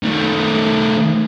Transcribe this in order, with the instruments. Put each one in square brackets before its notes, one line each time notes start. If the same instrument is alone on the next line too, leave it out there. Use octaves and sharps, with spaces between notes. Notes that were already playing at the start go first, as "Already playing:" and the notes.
[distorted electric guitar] D#3 A3